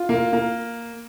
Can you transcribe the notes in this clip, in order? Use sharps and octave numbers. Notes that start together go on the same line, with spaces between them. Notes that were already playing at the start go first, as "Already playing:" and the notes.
Already playing: F4
A#3
A#3